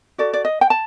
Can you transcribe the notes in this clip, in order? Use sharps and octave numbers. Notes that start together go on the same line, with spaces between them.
F#4 A4 D5
D5
D#5
G5
A5